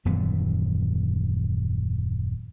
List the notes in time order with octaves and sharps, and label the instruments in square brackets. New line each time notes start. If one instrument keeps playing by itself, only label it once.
[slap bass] D#1 F#2 E3 B3